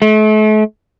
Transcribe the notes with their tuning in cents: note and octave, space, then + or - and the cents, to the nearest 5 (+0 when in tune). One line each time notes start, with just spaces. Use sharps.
A3 -40